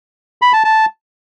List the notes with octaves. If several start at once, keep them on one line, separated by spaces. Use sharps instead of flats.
B5
A5
A5